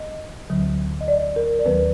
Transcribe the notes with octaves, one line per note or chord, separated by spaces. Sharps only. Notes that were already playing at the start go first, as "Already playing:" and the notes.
Already playing: D#5
D2 D3 F#3
D#5
D5
A#4
D5
D#2 D#3 F#3 B3 B4